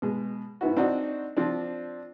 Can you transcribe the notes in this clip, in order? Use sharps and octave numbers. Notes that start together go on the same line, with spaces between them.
B2 G#3
G#2 B3 E4 F#4
C4 D4 D#4 F#4 D5 D#5
F3 C4 D4